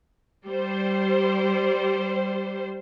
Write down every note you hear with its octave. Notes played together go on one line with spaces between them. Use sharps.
G3 C5